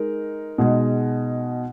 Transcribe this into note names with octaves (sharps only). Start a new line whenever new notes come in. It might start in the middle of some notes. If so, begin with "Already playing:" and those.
Already playing: G#3 D#4 A#4
B2 G#3 D#4 G#4